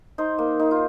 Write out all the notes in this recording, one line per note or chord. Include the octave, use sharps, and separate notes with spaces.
D#4 C5
A#3
D#4
F4